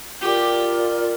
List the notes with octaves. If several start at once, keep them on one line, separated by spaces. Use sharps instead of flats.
F4 G4 A#4 D5